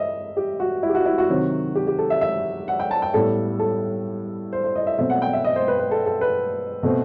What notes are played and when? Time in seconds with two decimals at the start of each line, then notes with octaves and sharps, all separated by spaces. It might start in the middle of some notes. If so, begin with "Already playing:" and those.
Already playing: D#5 E5
0.37 G4
0.60 F#4
0.83 E4
0.89 G4
0.95 F#4
1.06 E4
1.18 F#4
1.30 C3 D#3 F#3 C4
1.75 G4
1.87 G4
1.99 A4
2.10 E5
2.21 E5
2.68 F#5
2.80 G5
2.91 A5
3.02 G5
3.14 A2 G3 B3 A4
3.59 A4
4.53 C5
4.64 C5
4.76 D#5
4.87 E5
4.98 B2 F#3 A3 C4 E5
5.10 F#5
5.22 G5
5.33 E5
5.44 D#5
5.56 C5
5.68 B4
5.79 B4
5.91 A4
6.06 A4
6.21 B4
6.83 B2 A3 C4